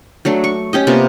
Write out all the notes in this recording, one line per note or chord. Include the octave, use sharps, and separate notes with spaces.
F#3 A3 D4
C#6
C#4 G4 D#5
C3 A#3 B3 F4